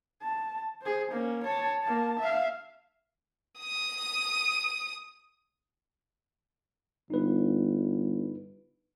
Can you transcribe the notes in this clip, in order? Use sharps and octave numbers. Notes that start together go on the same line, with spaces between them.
A5
G#4 C5
A#3 C#4
C#5 A5
A#3 A5
E5 F5
D#6 D#7
G1 D#4 B4